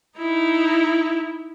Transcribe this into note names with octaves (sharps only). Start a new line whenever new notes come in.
D#4 E4